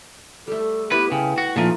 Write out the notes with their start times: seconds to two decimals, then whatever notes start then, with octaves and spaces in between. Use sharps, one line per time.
0.47 G3 A3 A4
0.92 B3 E4 G4 B4
1.12 C#3 G5
1.38 F#4
1.56 A#2 F3 A3 D#4 F4 C#6